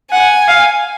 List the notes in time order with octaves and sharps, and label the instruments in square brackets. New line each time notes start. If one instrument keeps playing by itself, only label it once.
[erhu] F#5 [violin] G#5
[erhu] F5